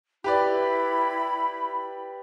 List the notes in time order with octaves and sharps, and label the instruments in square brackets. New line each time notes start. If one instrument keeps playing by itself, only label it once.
[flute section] E4 B5 [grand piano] G4 B4 D5